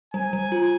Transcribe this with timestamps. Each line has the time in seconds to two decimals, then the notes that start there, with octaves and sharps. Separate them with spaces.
0.14 G3 G#5
0.33 G3
0.52 F4